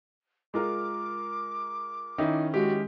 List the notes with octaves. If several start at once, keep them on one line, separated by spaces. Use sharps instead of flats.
G#3 F4 A#4 D6
D#3 C#4 D#4 E4
G#3 F#4 G4